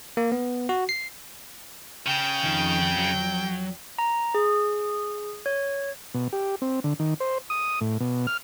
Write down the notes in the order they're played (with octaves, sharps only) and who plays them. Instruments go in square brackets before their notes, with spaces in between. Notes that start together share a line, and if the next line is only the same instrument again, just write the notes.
[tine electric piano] A#3
B3
F#4
C7
[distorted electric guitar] C#3 [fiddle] G5
[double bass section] F2 [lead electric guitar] D#3
[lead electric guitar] F#3
[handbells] A#5
G#4
C#5
[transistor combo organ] B2
G4
C4
D3
D#3
C5
D#6
A2
B2
F6